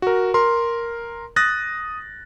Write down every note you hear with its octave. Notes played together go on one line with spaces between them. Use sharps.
F#4 A#4
A#4 C6
D#6 F#6 A6 A#6